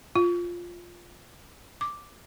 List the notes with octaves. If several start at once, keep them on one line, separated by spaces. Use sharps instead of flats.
F4
D6